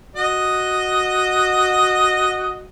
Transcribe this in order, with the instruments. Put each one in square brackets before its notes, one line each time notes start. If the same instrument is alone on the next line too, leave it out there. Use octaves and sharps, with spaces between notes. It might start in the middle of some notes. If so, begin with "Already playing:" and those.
[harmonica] F#4 D#5